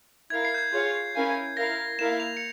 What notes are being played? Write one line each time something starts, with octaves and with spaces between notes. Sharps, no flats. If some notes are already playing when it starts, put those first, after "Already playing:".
E4 A#4 F5 G#6
C7
G6
G#6
F4 G#4 C#5 F5
C#4 E4 A#4 F5 G#5
E4 A#4 F5 A#6
A#3 E4 A#4 F5 E7
F7
C#7